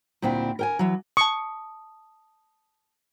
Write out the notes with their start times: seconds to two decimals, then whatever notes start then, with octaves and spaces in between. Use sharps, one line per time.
0.22 D2 A#2 C4 E4 G5
0.59 A#4 G5 G#5
0.79 E3 F#3
1.17 A5 C#6 D#6